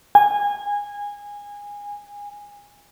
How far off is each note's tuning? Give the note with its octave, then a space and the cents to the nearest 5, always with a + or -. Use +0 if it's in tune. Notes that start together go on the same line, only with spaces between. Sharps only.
G#5 -20